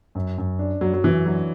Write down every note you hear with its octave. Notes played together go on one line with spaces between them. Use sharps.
F#2
F#2
D4
F#2 F#3
F#3
F#2 E3
F#3 D4